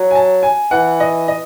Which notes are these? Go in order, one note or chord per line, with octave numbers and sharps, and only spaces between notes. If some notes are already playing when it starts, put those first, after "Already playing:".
Already playing: F#3
G#5
A5
G#5
E3 F#5
D#5
D#5